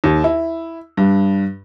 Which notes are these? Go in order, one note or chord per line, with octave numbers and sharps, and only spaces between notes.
D#2
E4
G2